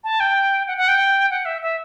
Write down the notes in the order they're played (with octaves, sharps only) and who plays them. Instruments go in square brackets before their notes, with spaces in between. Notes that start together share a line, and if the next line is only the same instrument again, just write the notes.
[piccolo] A5
G5
F#5
F#5
G5
F#5
E5
E5